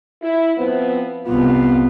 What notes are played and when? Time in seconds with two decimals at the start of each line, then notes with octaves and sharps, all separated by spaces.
0.21 E4
0.58 F3 B3 C4
1.27 C2 B3 F4